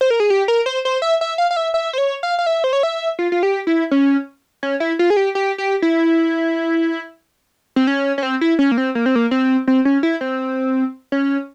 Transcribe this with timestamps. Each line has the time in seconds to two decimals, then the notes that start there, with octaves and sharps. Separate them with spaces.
0.01 C5
0.10 A#4
0.20 G#4
0.30 G4
0.48 A#4
0.66 C5
0.85 C5
1.02 E5
1.21 E5
1.38 F5
1.51 F5
1.57 E5
1.74 E5
1.93 C5
1.98 C#5
2.23 F5
2.39 F5
2.46 E5
2.64 C5
2.73 C#5
2.83 E5
3.19 F4
3.32 F4
3.43 G4
3.67 E4
3.91 C#4
4.63 C#4
4.80 E4
4.99 F4
5.10 G#4
5.17 G4
5.35 G4
5.58 G4
5.82 E4
7.76 C4
7.87 C#4
8.18 C#4
8.23 C4
8.41 E4
8.59 C#4
8.72 A#3
8.78 C4
8.95 A#3
9.06 C4
9.15 A#3
9.31 C4
9.68 C4
9.85 C#4
10.03 E4
10.21 C4
11.12 C#4